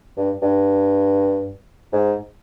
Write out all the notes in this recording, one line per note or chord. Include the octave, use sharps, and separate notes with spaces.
G2
G2
G#2